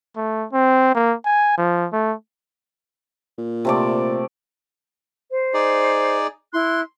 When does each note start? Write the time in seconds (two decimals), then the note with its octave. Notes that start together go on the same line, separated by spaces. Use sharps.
0.17 A3
0.53 C4
0.95 A#3
1.25 G#5
1.58 F3
1.93 A3
3.38 A#2
3.65 C3 A3 D5
5.30 C5
5.54 D#4 G#4 D5
6.54 E4 C6 F#6